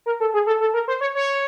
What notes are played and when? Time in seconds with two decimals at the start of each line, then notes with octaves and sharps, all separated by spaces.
0.06 A#4
0.20 A4
0.34 G#4
0.47 A4
0.60 A4
0.74 A#4
0.88 C5
1.01 C#5
1.15 C#5